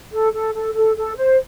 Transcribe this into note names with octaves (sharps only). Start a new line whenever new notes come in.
A4
A4
A4
A4
A4
C5